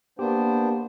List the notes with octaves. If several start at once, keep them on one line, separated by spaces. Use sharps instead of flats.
A#3 B3 D4 G4 C5